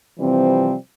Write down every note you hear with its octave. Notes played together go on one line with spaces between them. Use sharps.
C3 E3 F3 G3 C4